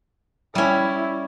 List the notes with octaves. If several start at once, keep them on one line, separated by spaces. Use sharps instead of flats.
G3 C#4 E4